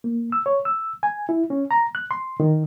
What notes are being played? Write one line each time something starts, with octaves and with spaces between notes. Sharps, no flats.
A#3
E6
C#5
E6
G#5
E4
C#4
A#5
F#6
C6
D#3